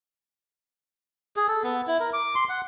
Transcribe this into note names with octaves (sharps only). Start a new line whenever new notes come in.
G#4
A4
B3
E4
A#4
D6
C6
F#5